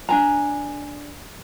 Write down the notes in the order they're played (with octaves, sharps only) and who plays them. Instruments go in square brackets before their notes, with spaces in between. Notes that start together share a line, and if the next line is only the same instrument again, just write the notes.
[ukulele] D4 G#5 A#5